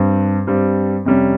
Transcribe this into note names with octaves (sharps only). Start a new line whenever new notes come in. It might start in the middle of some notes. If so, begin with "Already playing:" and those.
Already playing: G2 G3 C4
G2 G3 C4
F2 C3 G3 C#4